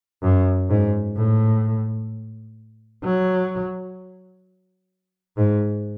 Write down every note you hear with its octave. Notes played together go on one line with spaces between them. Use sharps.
F#2
G#2
A2
F#3
G#2